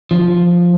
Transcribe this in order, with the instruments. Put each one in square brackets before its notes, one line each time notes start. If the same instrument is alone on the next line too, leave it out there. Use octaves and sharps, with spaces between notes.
[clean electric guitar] F3